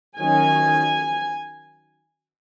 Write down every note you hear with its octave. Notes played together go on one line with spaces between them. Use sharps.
D#3 F#3 C#4 G#5